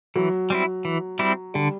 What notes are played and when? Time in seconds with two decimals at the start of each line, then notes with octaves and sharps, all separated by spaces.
0.16 E3 F#3
0.50 G3 C4 E4
0.85 E3
1.19 G3 C4 E4
1.54 D3 G3